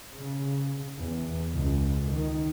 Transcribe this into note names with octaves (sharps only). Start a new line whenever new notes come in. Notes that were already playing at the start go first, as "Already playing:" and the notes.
C#3
E2
C#2
D#3